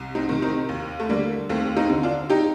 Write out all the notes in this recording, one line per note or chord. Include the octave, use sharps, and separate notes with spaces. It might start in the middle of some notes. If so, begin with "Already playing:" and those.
Already playing: C2
C4 D#4
C3 D#3
C4 D#4
D#2
A3
D3 G3 A#3
D#2 A3 C4
C4 D#4
D3
D4 F4
D#4 G4